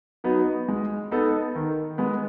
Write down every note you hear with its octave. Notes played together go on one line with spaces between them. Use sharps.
F#3 B3 D#4
G#3
B3 D#4 A4
D#3
G#3 B3